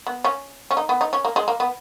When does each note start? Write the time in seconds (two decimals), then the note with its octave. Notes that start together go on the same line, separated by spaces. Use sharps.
0.07 B3
0.24 C#4
0.71 C#4
0.77 D#4
0.89 B3
1.01 D#4
1.13 C#4
1.25 A#3
1.36 G#3
1.48 A#3
1.60 B3